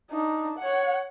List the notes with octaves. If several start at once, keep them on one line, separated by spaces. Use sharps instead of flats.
D4 D#4
C#5 F#5